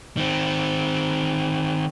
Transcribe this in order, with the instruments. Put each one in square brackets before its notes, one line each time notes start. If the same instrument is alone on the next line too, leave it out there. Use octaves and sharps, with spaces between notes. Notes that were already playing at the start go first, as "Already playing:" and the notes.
[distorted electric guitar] D#3 C4